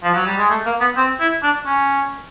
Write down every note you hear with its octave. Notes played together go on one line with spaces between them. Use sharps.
F3
F#3
G3
G#3
A3
A#3
B3
C4
E4
D4
C#4